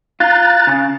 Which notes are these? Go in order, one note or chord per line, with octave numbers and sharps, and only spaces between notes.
F4 A#5 F#6 A6
C#3